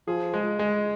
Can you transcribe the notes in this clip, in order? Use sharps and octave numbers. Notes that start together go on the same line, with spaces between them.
F3 G#4
G#3
G#3